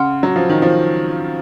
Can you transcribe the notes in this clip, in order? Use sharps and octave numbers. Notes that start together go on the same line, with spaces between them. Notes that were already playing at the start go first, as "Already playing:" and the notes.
Already playing: C#3 F#5 C6 F6
F#3
F3
D#3
F3